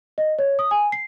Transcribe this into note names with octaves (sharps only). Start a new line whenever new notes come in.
D#5
C#5
D#6
G#5
C7